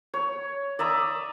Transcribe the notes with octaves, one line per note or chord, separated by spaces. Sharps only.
C#5
D5 E5 A#5 D#6